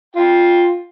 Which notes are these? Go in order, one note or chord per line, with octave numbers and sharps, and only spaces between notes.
F4 G5